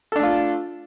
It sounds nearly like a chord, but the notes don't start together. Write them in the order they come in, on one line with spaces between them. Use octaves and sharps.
A4 D4 A3 F4